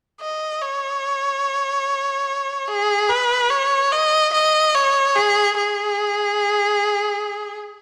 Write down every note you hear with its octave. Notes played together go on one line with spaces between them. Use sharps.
D#5
C#5
G#4
B4
C#5
D#5
D#5
C#5
G#4
G#4